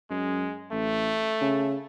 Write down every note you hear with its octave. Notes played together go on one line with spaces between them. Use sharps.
F#2 G#3
A1 A3
C#3